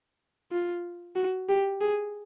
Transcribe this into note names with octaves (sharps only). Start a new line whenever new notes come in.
F4
F#4
G4
G#4